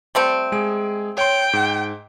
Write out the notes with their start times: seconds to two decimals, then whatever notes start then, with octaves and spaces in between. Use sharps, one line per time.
0.15 G3 A3 C4
0.52 G#3 G#4 D7
1.18 C#5 G5 C6
1.53 G#2